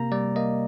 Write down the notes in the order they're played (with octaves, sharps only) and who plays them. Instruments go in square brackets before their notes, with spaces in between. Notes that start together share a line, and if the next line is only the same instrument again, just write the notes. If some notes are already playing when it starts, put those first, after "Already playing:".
Already playing: [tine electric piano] C3 A#3 A#5
G3 D5
A#3 D#5